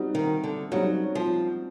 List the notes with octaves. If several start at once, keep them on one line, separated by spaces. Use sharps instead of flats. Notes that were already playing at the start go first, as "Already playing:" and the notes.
Already playing: G3 C4 D#4 F#4
D#3
D3
F#3 G3 C4 D#4 F#4
F3